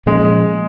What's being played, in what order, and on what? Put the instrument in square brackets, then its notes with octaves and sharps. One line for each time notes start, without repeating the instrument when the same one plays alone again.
[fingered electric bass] A#2 F3 A#3 C#4 [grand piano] G#3